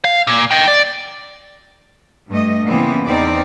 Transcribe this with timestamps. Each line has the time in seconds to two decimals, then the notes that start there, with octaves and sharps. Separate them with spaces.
0.05 F5
0.27 A#2
0.51 D#5 G5
0.68 D5
2.30 G2 A3 D#5
2.66 A#2 C#3 E3 B3 C4
3.07 E2 C4 D#4 D5